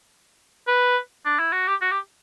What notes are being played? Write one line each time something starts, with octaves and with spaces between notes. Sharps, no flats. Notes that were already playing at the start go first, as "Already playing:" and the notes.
B4
D4
E4
F#4
G4
F#4
G4